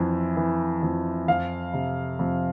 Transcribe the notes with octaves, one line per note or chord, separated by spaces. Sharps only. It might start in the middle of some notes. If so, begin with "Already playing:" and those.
Already playing: F2 E3
E3
F2
F2 F5
C3
F2